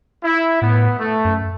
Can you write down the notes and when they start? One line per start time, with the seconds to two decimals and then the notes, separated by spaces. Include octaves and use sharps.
0.24 E4
0.61 A2 B3
0.99 A3
1.25 F#2